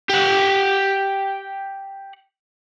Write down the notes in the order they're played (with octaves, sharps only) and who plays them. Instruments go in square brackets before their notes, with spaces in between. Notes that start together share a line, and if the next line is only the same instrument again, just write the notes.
[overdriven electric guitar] G4 F#5